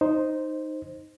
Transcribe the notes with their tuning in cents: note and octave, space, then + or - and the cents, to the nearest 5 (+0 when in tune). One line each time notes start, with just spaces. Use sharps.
D#4 +0 C5 +0